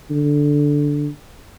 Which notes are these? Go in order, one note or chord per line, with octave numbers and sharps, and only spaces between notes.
D3